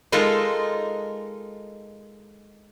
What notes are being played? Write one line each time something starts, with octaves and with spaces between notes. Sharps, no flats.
G#3 D#4 F4 A4 A#4